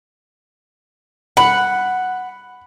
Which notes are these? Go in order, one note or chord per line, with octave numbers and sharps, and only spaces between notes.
F#5 B5